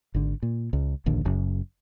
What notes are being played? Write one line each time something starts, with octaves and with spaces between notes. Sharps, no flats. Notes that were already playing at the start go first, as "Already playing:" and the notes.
G#1 D3
A#2
C#2
D1 A#1 D#2 D3
F#1 F#2 C#3